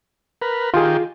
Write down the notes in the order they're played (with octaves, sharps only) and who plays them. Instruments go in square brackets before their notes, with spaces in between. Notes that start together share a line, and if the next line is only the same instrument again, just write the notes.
[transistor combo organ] A#4 B4
[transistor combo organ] D#3 G4 [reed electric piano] F4 G#4